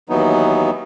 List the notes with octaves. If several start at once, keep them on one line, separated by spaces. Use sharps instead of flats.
D#2 E3 F#3 B3 D#4